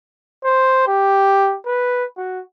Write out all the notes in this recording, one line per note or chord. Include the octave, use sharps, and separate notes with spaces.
C5
G4
B4
F#4